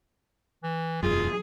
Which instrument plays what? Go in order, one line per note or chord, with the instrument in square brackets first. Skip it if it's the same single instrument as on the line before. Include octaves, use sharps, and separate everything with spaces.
[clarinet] E3
[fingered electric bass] E1 F#2 [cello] F#3 G#4 [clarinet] F4